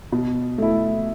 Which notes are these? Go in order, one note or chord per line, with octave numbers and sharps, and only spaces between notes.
B2
A3 E4